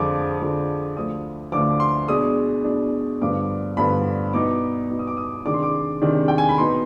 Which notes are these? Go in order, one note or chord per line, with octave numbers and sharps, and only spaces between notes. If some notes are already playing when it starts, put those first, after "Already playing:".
Already playing: F2 D3 F3 G#3 D6
F2 D3 F3 G#3
D2 D3 F3 D#6
D2 D3 F3 D6
C6
B2 G#3 D4 D#6
B2 G#3 D4
G2 D3 F3 B3 D6
G2 D3 F3 B3 B5
B2 B3 D#4 D6
B2 B3 D#4
D#6
D6
D#6
C3 D#3 G#3 D4 D6
C6
D6
C3 D#3 G#3 D4
G5
G#5
B5
B2 B3 D#4 C6